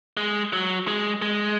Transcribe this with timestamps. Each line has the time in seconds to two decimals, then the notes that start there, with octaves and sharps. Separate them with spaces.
0.17 G#3
0.53 F#3
0.88 G#3
1.22 G#3